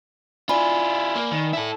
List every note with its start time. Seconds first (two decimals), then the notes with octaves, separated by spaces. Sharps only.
0.49 E4 F4 D5 G#5 B5
1.15 A#3
1.32 D#3
1.53 E4 A4